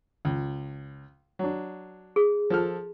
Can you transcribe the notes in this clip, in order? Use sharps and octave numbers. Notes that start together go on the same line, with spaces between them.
C#2
F#3 D4
G#4
F3 A4 F6